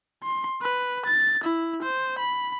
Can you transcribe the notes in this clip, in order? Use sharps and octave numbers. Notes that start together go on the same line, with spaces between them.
C6
B4
A6
E4
C5
B5